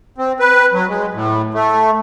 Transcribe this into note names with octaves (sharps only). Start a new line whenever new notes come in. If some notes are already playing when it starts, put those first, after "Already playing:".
C4
B4
F#3
G#3
A2
A3